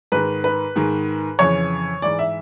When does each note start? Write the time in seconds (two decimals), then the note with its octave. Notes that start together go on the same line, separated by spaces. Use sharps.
0.12 G#2 D#3 B4
0.44 B4
0.76 G#2 D#3
1.39 F2 C#3 E3 C#5
2.02 G#2 E3 D5
2.19 E5